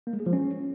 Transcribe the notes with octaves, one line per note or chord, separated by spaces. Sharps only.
A#3
G#3
G#4
F3
C#4